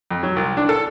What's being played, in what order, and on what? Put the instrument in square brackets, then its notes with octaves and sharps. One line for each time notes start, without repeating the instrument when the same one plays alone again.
[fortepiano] F2
F#3
C2
D4
A4